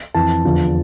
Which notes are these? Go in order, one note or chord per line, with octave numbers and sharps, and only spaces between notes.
F2 E3 A5
E2 D3 F3